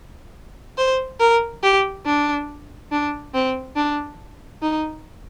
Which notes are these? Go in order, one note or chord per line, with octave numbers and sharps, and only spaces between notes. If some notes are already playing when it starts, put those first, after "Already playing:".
C5
A#4
G4
D4
D4
C4
D4
D#4